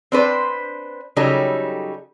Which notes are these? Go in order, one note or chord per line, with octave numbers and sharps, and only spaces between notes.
C4 D4 B4 C5
C#3 F#3 G3 D#4 G4 A4